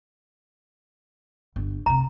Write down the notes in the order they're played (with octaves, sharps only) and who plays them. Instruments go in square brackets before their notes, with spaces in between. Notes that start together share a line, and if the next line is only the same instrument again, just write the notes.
[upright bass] G1
[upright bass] F1 C3 [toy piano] A#5